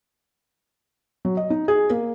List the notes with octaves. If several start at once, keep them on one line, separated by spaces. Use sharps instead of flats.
F#3
D#5
D#4
G#4
A#3